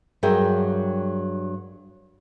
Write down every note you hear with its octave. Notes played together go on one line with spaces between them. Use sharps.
G2 F#3 G#4 A#4 E5 G5